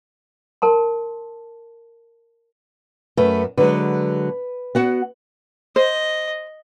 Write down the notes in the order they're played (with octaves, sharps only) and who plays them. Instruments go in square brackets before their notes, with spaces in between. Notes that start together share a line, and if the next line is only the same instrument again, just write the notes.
[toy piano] A#4 A5 C6
[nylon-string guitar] F#2 [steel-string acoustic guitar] A3 B4
[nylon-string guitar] D3 F#3 G#3 [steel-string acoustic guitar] B4
[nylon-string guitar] B3 F#4 F#5
[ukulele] C5 [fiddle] D#5